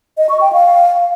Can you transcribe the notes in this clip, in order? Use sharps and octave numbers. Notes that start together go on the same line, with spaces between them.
D#5
C#6
G5
F5